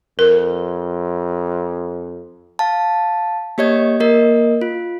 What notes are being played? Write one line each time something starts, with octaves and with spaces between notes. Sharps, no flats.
F2 A#4
F5 A5
A#3 G4 C#5 D#5 G#6
A#3 A#4 D#5
F4